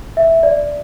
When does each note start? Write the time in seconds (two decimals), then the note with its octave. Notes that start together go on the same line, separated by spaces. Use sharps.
0.17 E5
0.43 D5